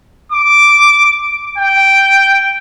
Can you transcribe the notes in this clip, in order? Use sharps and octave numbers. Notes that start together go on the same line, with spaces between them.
D6
G5